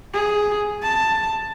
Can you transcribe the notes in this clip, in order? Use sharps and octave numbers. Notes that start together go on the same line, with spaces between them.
G#4
A5